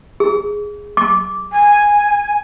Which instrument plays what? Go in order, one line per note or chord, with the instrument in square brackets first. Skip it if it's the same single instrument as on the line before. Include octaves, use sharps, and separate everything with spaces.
[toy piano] G#4
D6
[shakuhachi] G#5